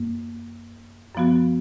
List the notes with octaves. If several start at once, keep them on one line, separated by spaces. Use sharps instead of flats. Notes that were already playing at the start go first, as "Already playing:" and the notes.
Already playing: F#2 A#3
F#2 F3 B3 F#4